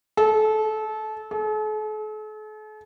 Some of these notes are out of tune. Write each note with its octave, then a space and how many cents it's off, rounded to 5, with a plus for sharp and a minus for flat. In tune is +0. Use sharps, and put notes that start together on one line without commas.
A4 -25
A4 -45